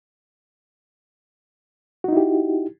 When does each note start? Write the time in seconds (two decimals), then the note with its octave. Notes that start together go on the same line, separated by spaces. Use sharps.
2.04 F#4
2.08 D#4
2.13 E4
2.17 G4